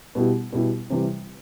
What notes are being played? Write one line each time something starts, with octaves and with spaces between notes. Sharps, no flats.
B2 G3 B3 E4 G4
B2 G3 B3 E4 G4
C3 E3 G3